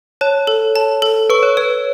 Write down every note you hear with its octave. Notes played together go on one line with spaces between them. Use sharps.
C#5 A5
A4
A5
A4
B4 C#6
C#5
B4 C#5